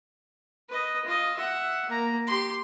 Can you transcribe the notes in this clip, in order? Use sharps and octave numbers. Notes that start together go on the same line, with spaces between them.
B4 D#5
F4 D#5
E5 F#5
A#3 A#5
G4 C6